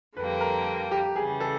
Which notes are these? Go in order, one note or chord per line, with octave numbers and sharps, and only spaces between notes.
F2 D3 G3 A#3 B4
A#4
G4
C#3 E3 G3 G#4
A4